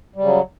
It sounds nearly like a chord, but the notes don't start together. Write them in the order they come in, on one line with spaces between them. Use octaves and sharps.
G3 C#3 F#3